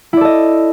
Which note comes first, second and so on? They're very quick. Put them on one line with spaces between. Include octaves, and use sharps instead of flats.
E4 D5 A4 D#5